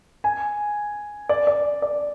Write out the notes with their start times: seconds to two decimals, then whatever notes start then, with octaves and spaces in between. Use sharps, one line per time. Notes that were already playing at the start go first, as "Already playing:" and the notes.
0.24 G#5
1.29 D5
1.47 D5
1.82 D5